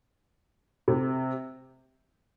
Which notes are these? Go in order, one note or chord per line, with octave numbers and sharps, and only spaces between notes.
C3